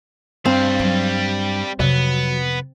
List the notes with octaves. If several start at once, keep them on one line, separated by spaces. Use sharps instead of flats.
G2 G3 C4 F5
F#3
F2 C3 F#3 B3